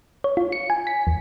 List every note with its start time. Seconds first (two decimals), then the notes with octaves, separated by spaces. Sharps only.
0.24 C#5
0.37 F4
0.52 C#7
0.70 G#5
0.87 B6
1.07 E2